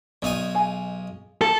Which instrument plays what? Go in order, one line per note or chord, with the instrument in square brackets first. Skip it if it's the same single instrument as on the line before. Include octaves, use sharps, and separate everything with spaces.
[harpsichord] B1 D#4 G#5 [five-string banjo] D#3 D5 D#5
[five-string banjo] G#4 F5
[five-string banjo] A3 A#3 A5 [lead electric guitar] A4